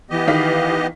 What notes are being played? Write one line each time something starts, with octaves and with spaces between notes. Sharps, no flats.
E3 B3 G4 D#5
D#3 F5 B6